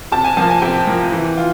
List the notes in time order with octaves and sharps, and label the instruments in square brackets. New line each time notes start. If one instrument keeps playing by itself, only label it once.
[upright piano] C3 A5
G#5
F3 A#3 A5
G#5
C3 G5
F3 A#3
E3
F4